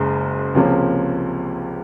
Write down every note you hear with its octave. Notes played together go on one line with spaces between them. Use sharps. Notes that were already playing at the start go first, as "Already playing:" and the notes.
Already playing: F#1 F#2 C#3 G#3
C#2 C3 F3 A#3 C#4